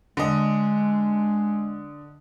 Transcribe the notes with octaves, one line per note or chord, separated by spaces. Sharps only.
D3 G#3 D#5